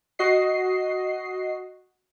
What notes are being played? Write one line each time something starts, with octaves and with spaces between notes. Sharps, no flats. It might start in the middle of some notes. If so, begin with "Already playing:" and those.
F#4 D#5 C7